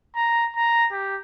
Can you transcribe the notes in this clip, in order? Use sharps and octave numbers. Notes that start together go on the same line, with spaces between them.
A#5
A#5
G4